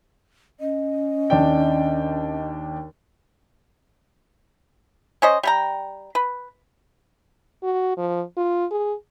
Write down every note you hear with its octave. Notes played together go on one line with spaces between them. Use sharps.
C#4 D#5
D#2 D4 G5
C#4 C5 D#5
G3 G5 A#5
B4
F#4
F3
F4
G#4